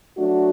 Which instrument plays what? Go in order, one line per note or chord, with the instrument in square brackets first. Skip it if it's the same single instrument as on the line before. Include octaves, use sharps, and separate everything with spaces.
[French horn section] F#3 A3 D4 F#4